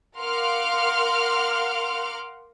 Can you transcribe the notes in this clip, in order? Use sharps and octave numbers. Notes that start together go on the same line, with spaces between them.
A#4 F5 F#5 C6 D6 F6